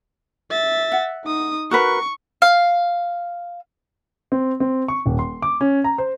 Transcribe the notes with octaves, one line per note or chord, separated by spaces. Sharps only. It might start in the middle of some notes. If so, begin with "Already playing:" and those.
E5 A6
F#5
D#4 D#6
F#4 A#4 B4 C#6
F5
C4
C4
C#6
D#1
C6
D6
C#4
A#5
C5